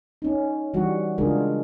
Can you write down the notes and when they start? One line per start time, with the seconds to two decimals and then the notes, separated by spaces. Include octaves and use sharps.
0.22 C#4 D#4
0.74 E3 G3 F#4
1.18 C#3 G#3 D4 F4 G#4 A#4